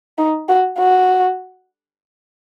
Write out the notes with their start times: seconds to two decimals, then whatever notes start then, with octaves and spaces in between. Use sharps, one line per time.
0.18 D#4
0.49 F#4
0.78 F#4